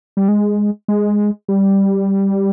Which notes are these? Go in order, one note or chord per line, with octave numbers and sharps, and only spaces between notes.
G3
G#3
G#3
G3